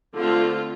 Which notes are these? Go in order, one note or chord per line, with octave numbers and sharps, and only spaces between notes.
D3 A3 C4 F4